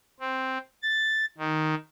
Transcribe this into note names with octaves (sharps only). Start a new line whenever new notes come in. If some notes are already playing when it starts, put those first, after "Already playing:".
C4
A6
D#3